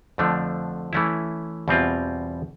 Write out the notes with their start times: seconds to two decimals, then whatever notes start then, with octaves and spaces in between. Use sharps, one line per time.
0.18 F2 D3 F3 A3 D4
0.93 E3 A3 C#4 E4
1.68 E2 B2 G3 C4 F4